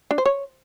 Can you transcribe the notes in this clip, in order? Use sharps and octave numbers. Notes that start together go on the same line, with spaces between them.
D4
C5
C#5